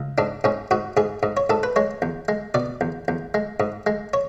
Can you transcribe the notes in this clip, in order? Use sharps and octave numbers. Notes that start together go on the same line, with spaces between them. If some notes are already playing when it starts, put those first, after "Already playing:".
Already playing: C#2
G#2 D4
G#2 C#4
G#2 F#4
G#2 G#4
G#2
C#5
G#2 A4
B4
G#3 C#5
E2
G#3
B2 D5
E2
E2
G#3
G#2
G#3
C#5